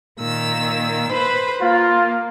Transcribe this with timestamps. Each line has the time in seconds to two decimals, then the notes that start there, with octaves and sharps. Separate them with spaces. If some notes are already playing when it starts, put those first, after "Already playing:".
0.19 A#2 D#3 E6
1.12 B4 C5 B5
1.62 A#3 F4